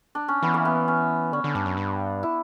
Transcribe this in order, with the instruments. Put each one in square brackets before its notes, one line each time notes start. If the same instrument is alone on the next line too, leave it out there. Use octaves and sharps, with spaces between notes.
[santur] D4
C#4
[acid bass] E3 [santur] B3
[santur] A#3
B3
C#4
[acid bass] D3 [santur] C#4
[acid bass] D3
[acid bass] G2 [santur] D4
[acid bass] F#2
G2
[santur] E4